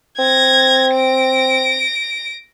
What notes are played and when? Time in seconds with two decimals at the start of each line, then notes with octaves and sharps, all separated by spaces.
0.19 C4 G#6 A#6
0.92 A#6 D7